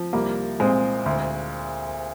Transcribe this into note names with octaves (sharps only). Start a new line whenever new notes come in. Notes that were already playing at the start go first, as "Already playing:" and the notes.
Already playing: F3
C2 G3 A#3
A#2 G#3 C4
D2